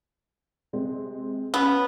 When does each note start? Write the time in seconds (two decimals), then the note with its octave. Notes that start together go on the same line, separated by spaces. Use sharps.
0.73 C3 G#3 C4
1.54 B3 C#4 G#5